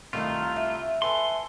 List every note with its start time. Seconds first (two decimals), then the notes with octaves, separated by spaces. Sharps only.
0.13 C2 D#3 A3 D#4 F4 F5
0.56 E4 E5
1.02 A4 B4 G#5 C6